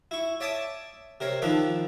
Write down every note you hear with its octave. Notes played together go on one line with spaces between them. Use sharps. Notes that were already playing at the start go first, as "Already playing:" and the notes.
E4 C#6
C#5 D5 E5 A5 D6 D#6
C3 A#4 C5 C#5
D#3 F3 D4 D#4 A4 B4